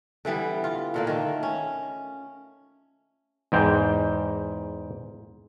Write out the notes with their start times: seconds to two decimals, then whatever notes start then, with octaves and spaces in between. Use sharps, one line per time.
0.25 D3 E3 G3 B3
0.64 F4
0.94 A#2 D3 A#3
1.07 D#3 A3
1.43 C#4
3.52 E2 G#2 G5